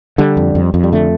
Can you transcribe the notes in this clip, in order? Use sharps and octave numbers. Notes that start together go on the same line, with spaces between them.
D3 G3
F2
F2
F2
G3
D3 A3